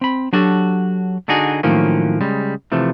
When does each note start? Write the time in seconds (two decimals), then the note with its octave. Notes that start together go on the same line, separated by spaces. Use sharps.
0.01 C4 B5
0.33 F#3 D4 F#4 G4 A4
1.28 D3 D4 D#4 F#4 G#4
1.63 A2 D#3 F3 F#3 A#3 C#4
2.21 C#3 G3 G#3
2.72 C3 E3 F3 A3